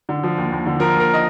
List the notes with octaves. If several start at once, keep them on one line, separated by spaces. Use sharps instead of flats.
D3
F3
D#2
D#2
D3
F3 A#4
D#2 A#4
D#5